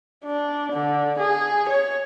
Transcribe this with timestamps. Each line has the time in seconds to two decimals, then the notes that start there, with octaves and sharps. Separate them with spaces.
0.25 D4
0.73 D3
1.19 G#4
1.69 C#5